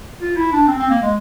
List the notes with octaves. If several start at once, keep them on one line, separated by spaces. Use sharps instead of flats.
F4
E4
D4
C4
C4
A#3
G#3